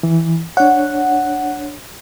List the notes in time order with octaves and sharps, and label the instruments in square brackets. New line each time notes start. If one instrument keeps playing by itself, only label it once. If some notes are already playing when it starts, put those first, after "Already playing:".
[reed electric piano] E3
[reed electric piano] D4 C#5 [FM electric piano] F#5